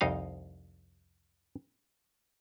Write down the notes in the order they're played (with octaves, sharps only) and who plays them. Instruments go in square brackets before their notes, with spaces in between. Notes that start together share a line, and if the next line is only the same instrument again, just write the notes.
[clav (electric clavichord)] C2 F2 D#4 F5